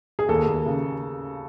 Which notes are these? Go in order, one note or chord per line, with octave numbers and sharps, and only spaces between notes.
G#4
D#2 A4
D#2
C#3